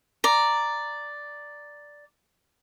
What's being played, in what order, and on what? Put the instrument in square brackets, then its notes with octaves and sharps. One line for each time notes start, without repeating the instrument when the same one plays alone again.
[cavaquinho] D5 A#5